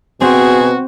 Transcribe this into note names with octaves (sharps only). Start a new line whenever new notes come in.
B2 C4 F#4 G#4